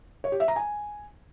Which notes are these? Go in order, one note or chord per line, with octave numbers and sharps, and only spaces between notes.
C#5
G4
E5
A#5
G#5